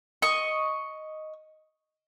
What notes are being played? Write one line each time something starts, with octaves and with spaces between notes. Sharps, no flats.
D#5 C#6